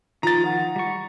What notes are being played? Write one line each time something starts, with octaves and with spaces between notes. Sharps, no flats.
D#3 F3 F4 A#5 A6
F#5
G3 C#6